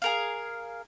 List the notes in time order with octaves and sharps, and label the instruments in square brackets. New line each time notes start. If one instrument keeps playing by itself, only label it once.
[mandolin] G#4 A#4 F5